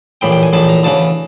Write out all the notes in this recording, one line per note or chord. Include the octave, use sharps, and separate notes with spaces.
A#1 A2 E3 G5
G5
G#5
A#1 A2 E3 A5
A#5
D2 C#3 E3 A5